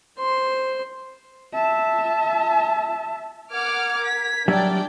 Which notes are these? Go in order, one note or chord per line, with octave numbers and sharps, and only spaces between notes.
C5 C6
E5 A5
A#4 F#5 D6 F6 G#6
B6
F#3 G3 D4 D5 E5 G5